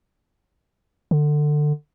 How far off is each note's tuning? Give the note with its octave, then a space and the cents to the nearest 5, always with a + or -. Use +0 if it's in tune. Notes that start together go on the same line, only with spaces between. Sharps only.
D3 +20